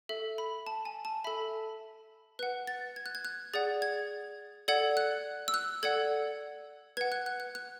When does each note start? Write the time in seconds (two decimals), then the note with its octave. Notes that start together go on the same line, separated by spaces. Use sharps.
0.09 A4 E5
0.38 B5
0.67 A5
0.85 G#5
1.05 A5
1.24 A4 E5 B5
2.39 B4 F#5 F#6
2.67 A6
2.96 G#6
3.06 F#6
3.15 G#6
3.25 F#6
3.54 G#4 D5 F#5 A6
3.82 G#6
4.68 A4 D5 F#5 G#6
4.97 F#6
5.48 E6
5.54 F#6
5.83 A4 D5 F#5 G#6
6.97 B4 F#5 G#6
7.12 F#6
7.26 F#6
7.40 F#6
7.55 F#6